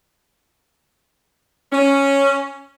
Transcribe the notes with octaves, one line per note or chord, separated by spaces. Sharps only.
C#4